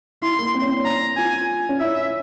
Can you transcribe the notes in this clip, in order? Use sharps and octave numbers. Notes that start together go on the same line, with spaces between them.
E4 C6
A#3
C4
C#4
C4
C#4 A#5
F4 G#5
C#4
E4 E5